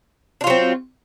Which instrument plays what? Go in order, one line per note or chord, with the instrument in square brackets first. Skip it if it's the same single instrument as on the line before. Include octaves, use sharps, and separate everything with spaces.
[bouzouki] D4
F4
F#3
C4